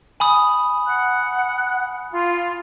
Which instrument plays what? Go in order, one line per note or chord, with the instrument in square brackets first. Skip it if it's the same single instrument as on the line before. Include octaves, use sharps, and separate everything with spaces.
[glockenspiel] G#5 B5 D#6
[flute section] F#5 F#6
F4